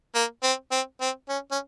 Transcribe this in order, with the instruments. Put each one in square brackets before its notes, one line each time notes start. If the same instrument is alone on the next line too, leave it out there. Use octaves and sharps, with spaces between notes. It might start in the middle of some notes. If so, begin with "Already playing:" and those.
[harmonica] A#3
C4
C4
C4
C#4
C#4